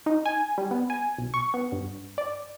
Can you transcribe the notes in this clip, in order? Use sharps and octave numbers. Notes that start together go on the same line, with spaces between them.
D#4
G#5
G3
B3
G#5
B1
C#6
B3
G2
D5